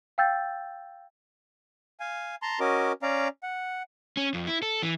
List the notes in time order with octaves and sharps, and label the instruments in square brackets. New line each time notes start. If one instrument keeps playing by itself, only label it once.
[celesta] F5 G5 E6 G6 A6
[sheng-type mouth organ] F5 G#5
A5 A#5 C6
C#4 F#4 A#4 D#5 D6
C#4 D5 F5 A#5
F#5
[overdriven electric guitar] C#4
F2
E4
A4
E3